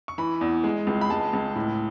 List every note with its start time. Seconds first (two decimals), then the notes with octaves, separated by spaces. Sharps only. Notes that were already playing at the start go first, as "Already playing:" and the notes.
0.08 C#6
0.18 E3 B5
0.41 E2
0.64 G#3
0.87 C#2
1.01 B5
1.10 G#3 A5
1.33 C#2
1.55 A2